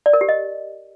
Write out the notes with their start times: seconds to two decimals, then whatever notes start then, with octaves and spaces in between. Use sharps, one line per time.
0.06 D5
0.13 A#4
0.21 G4
0.29 D#5